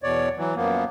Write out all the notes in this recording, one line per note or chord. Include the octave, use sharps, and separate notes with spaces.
E2 B2 C#5 D5
E3 F#3
F#2 F3 A#3 B3